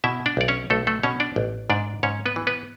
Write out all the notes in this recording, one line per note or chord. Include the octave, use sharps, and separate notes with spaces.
B2 E4 E5
D4 D5
B1 D5
C#4 C#5
B1 A3 A4
A3 A4
B2 C#4 C#5
D4 D5
A1
G#2 D4 D5
G#2 C#4 C#5
B3 B4
E3
B3 B4